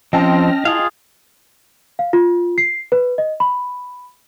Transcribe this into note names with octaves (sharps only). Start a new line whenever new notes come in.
F3 C4 C#4 D#5 G5 A5 F6 A#6
E4 F4 G#4 F5 F#6
F5
F4
C7
B4
D#5
B5